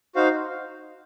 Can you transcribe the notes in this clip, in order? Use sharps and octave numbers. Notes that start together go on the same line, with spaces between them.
D#4 F#4 C5 F5